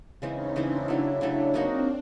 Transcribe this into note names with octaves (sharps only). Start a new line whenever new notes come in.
C#3 E3 G#3 C4 C#4 D#4
C#3 E3 G#3 C4 D4 E4
C#3 F#3 A3
C#3 F#3 A3
F#3 A#3 C4 D4 D#4 F#4